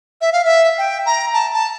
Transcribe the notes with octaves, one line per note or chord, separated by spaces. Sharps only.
E5
F5
E5
G5
A#5
A5
A5